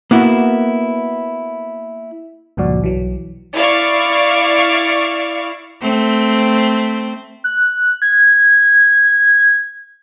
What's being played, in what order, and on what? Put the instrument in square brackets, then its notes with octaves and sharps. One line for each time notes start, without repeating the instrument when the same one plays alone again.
[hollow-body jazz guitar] A#3 B3 E4 F#4
[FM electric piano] C#2 G2 A#2 F3 F#4 D5
B1 E3 F#3
[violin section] E4 D5 F5 C#6
[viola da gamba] A3 C4
[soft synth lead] F#6
G#6